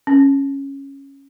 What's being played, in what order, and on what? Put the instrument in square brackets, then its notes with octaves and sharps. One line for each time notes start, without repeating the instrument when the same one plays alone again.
[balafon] C#4